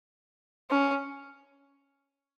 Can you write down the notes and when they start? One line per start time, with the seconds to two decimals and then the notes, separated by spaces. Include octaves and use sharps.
0.70 C#4